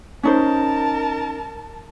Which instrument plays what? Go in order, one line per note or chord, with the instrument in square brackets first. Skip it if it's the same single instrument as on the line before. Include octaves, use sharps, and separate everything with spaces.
[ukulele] C#4 D#4 C5 [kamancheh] A#4 A5